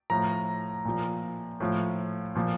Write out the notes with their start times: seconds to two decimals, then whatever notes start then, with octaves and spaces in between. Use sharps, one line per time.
0.10 A2 F3 A#5
0.85 A#2 F3
1.60 A2 F3
2.35 A#2 F3